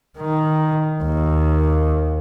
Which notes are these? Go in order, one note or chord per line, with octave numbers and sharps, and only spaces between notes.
D#3
D#2